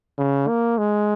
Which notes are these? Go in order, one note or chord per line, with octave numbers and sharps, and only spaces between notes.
C#3
A#3
G#3